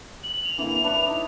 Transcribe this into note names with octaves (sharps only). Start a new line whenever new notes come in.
F#7
F7
D3 E3 A#3 E4
C#4 D4 B4 B5 C#6
D#4 E4